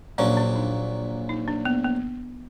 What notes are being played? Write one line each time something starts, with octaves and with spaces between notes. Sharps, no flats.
A#1 A#2 F#3 C#4
D4
D#4
D#4
D4
B3
B3